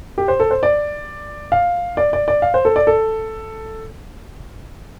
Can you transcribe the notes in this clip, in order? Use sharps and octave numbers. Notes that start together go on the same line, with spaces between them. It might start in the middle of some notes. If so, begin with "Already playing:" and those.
G4
C5
A4
C5
D5
F5
D5
D5
D5
F5
C5
A4
D5
A4